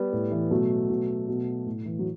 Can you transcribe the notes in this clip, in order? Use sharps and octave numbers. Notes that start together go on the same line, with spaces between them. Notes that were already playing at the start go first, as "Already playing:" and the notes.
Already playing: G3 B3
A2
E3
B2 F#3 A3
B2
B2
A2
E3
F#3